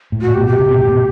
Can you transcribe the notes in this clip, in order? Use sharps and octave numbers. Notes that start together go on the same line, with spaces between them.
A2
F#4
A2
G4
B2
G4
C3
B2
A2
B2